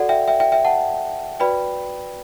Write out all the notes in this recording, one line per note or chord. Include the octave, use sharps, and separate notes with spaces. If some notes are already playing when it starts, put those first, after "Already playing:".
Already playing: F#4 A4 D5 F#5
E5 G5
E5 G5
E5 G5
E5 G5
F#5 A5
F#4 B4 D5 G5 B5